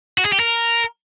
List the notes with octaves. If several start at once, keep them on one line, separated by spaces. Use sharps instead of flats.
F#4
G#4
G4
A#4